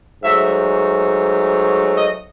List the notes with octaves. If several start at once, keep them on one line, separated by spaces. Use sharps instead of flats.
G#2 F#3 A3 E5
D#5